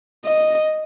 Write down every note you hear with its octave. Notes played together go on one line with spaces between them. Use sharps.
D#5